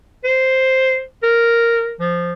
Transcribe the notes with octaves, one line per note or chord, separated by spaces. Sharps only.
C5
A#4
F3